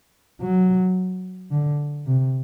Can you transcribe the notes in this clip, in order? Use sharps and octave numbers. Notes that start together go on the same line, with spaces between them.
F#3
D3
C3